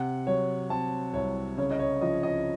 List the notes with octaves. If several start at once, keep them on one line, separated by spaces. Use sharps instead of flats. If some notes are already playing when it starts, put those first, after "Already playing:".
Already playing: C3 F#5
F#3 C#5
C4 A5
C2 C#5
C#3 C#5
D#5
C#5
F3 D#5
D#5